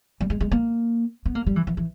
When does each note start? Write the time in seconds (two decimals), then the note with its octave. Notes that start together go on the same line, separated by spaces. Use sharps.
0.20 G3
0.30 G#3
0.40 G#3
0.51 A#3
1.25 B3
1.35 A#3
1.46 G3
1.56 E3
1.67 E3
1.77 E3